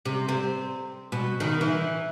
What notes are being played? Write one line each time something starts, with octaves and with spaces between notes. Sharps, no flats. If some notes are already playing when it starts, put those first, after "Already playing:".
C3
C4
B2
D#3
E3